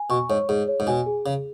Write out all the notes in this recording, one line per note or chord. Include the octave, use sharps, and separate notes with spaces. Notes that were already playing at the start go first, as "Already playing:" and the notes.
Already playing: G#5
B2 C#6
G#2 C#5
G#2 G#4
C#5
G#2
B2 G#5
G#4
C#3 G#4